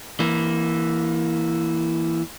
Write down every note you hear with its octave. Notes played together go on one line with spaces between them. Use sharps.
E3 A#3